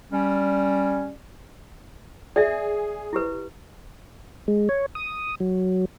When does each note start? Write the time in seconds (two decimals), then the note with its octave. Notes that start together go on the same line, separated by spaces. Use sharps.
0.12 G3 C#4
2.36 G#4 D5 E5
3.13 E4 G4 B4
4.48 G#3
4.69 C#5
4.95 D#6
5.40 F#3